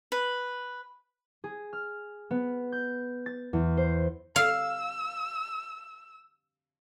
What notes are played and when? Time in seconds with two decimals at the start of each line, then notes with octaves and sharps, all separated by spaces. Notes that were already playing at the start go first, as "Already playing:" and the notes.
0.12 B4
1.44 G#4
1.73 F6
2.31 B3
2.72 G6
3.26 A6
3.53 E2
3.77 C5
4.36 F5 E6